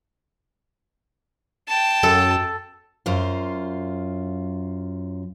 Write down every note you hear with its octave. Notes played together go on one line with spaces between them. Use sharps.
G5 A5
F#2 A4
F#2 F4 C5